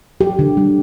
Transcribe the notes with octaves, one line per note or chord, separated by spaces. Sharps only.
F#3 G4
D3
G3